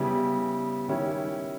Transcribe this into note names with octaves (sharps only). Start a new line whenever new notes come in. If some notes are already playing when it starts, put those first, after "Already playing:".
Already playing: C#3 G3 B3 E4
D#3 G3 C#4 E4